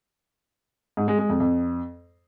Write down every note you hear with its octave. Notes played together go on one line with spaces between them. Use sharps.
G#2
G#3
G#3
F2
F2